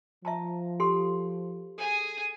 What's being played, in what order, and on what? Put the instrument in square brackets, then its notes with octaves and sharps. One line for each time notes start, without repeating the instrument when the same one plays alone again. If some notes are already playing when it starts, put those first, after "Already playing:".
[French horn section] F3 [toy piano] E5 A5 A#5
[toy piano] G4 A4 C6
[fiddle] G#4 G#5 [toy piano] A4